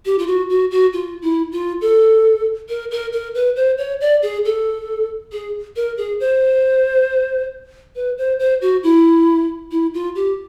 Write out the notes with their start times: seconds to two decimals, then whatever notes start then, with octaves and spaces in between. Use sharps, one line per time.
0.05 G4
0.18 F4
0.27 F#4
0.50 F#4
0.71 F#4
0.93 F4
1.22 E4
1.52 F4
1.81 A4
2.69 A#4
2.91 A#4
3.13 A#4
3.35 B4
3.56 C5
3.78 C#5
4.01 D5
4.22 G#4
4.45 A4
5.32 G#4
5.76 A#4
5.98 G#4
6.20 C5
7.96 B4
8.18 C5
8.39 C5
8.62 F#4
8.83 E4
9.71 E4
9.94 F4
10.15 G4